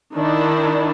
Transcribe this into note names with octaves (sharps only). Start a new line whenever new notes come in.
D#3 D4 E4